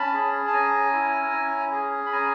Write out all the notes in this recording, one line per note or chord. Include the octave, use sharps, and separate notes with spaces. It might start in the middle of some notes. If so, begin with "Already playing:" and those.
Already playing: C#4 A5 B5
G#4
A5
C#4 G#5 A#5
E4
C#4
G#4
B5
C#4 G#5 A#5